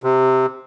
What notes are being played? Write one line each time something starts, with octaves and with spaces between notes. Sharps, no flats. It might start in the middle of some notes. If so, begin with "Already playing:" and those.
C3